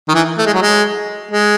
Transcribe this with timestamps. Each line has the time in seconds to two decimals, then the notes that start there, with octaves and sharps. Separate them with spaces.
0.08 D#3
0.14 E3
0.38 A3
0.46 G#3
0.54 F#3
0.62 G#3
1.31 G#3